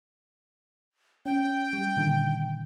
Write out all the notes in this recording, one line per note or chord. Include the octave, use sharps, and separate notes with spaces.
C#4 G5
G3
A#2 D3 D#3